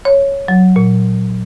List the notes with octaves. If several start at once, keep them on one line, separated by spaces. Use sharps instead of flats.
C#5
F#3
A#2